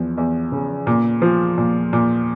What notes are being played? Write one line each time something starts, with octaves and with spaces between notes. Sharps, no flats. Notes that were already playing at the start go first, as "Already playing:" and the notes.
Already playing: E2 F3
E2
C#3
A#2
F3
A#2
A#2